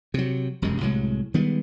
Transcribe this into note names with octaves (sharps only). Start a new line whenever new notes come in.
C3 F#3
E1 F#2 C3 G#3
C2 A2 F#3 G#3
D#3 G3 G#3 B3